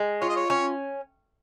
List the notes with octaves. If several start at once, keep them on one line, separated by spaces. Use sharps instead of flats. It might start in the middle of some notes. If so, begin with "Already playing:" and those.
Already playing: G#3
F4 C#5
D#5
C#5
C#4 C#5